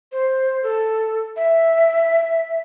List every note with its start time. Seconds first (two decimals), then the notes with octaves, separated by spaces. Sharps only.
0.12 C5
0.63 A4
1.36 E5